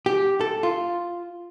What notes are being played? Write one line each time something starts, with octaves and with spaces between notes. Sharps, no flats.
G4
A4
F4